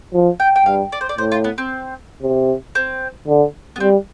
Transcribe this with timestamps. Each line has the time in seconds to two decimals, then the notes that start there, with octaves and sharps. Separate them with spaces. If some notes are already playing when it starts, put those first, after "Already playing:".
0.14 F3
0.40 G5
0.56 G5
0.66 G2 F5
0.92 D5
1.01 C5
1.09 D5
1.18 A2 C5
1.32 F4
1.44 B3
1.58 C4
2.23 C3
2.75 C4
3.27 D3
3.76 B3
3.80 G3 C4